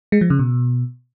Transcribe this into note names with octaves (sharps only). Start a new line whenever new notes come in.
G#3
F3
C#3
B2